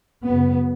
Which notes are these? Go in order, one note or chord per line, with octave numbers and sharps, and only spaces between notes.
F#2 C#3 B3